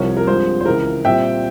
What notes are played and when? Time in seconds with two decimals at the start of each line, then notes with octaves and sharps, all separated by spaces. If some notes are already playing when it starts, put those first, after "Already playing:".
Already playing: C2 C3 F3 A#4 C#5
0.17 A#4
0.27 G2 F3 G#3 C4 C5
0.61 C5
0.66 C#2 C#3 E3 A#4
1.05 A#2 G3 C4 E5 G5